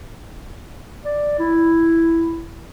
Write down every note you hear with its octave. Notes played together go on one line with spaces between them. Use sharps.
D5
E4